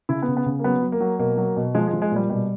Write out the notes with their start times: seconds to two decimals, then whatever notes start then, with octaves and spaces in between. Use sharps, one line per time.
0.09 C#3 E4
0.22 B3
0.28 C#3
0.37 B3
0.46 C#3
0.59 A#3
0.64 F#3 B3
0.82 F#3
0.92 A#3
1.00 F#3
1.19 B2 A#3
1.38 F#3
1.57 B2
1.75 F3 G#3
1.88 G#3
1.93 F3
2.02 G#3
2.11 A#2 G3
2.29 B2 G3